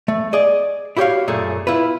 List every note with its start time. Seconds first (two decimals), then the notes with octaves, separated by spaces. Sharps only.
0.08 A3
0.33 G#4 D5 D#5
0.97 E4 F#4 G4 C5 C#5 F5
1.28 F#2 A#2 A3 G#4
1.67 E4 F4 B4